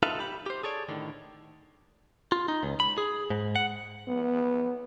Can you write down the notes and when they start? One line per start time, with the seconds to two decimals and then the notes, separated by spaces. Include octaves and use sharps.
0.03 D#4 F4 A4 B4 E5 F5
0.19 G4 B5
0.46 G4 C5
0.63 G#4 A4 C#5 D5
0.89 A2 D3 D#3
2.32 F4
2.48 D#4
2.63 C#2
2.80 B5
2.98 G#4
3.30 G#2
3.56 F#5
4.07 B3